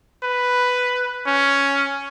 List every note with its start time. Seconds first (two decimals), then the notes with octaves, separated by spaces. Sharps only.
0.23 B4
1.26 C#4